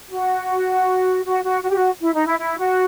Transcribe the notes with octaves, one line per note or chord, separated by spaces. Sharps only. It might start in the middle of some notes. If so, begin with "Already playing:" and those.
F#4
F#4
F#4
F#4
G4
F#4
E4
D#4
E4
E4
F#4